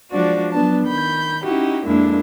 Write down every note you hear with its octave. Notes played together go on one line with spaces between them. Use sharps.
F3 G#3 D4 F#4 D5
F#3 B3 D4 A5
D#3 B5 G6
C#4 D#4 E4 F#4 G4
F2 A#2 G#3 A#3 D4 E4